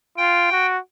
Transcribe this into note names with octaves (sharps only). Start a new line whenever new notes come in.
F4 G5
F#4